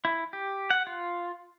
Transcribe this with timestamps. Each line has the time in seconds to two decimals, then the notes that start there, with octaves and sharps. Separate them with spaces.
0.05 E4
0.33 G4
0.70 F#5
0.87 F4